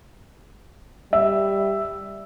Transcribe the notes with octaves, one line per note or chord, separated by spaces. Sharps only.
G3 E5